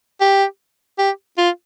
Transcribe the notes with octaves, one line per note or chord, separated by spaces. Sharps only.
G4
G4
F4